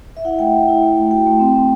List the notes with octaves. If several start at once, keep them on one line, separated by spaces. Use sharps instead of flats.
E5
E4 F#5
A3 G5
E4
E4
A3
A3
F#4 G5
A3
C4
C4